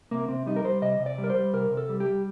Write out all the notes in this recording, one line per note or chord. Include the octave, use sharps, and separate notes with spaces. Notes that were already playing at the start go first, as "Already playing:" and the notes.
C3 A#3
C3 C4
G3 D#4
A#4
G3 C5
C3 D#5
C3
D5
G3
A#4
C5
G3
C3 A#4
C3
A4
G3
G4
G3